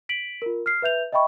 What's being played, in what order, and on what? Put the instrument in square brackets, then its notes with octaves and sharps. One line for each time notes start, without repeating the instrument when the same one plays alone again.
[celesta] B6 D7 F#7
F4 A#4
F6 C7
B4 E5 G6 F7
D#5 E5 G5 B5 C#6